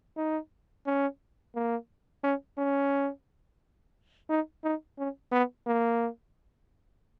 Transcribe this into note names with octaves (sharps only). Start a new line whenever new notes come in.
D#4
C#4
A#3
C#4
C#4
D#4
D#4
C#4
B3
A#3